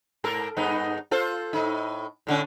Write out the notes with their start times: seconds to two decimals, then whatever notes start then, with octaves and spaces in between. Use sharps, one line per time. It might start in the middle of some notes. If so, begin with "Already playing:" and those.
0.24 G#2 A4 A#4
0.57 G2 B3 D#4
1.11 F4 A4 C5
1.53 A2 D#4
2.27 A2 D3 C#4